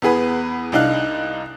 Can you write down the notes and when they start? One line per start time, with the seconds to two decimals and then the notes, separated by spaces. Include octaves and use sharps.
0.02 E2 B3 G#4 B4
0.72 C2 D4 D#4 F5 F#6